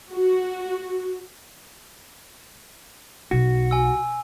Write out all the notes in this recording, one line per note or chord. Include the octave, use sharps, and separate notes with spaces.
F#4
B1 F#4
G#5 E6